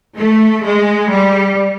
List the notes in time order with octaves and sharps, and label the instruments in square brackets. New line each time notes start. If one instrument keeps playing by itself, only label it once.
[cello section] A3
G#3
G3